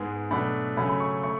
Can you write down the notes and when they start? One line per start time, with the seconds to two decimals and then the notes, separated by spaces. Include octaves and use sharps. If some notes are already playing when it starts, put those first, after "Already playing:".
Already playing: G#2 G#3 B3
0.30 B2 F#3 A3 D4 B5
0.77 C#3 F#3 A3 C#4 B5
0.89 B5
1.00 C#6
1.23 A3 C#6